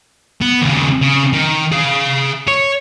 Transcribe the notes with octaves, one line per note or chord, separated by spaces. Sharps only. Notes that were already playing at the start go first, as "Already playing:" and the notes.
B3
D#2 C#3
C#3
D#3
G#4 F5
C#5